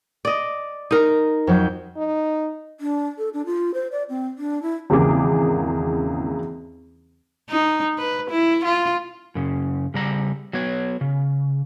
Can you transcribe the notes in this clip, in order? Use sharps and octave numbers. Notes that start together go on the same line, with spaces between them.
D5 D#5
D#4 A#4
F2 F#3 G6
D#4
D4
A4
D4
F4
C5
D5
C4
D4
E4
G#1 E2 C#3 A#3 G#4 D6
D#4
B4
E4
F4
F#2 C#3
C#3 G3 A#5
F#3 B3 C#5
C#3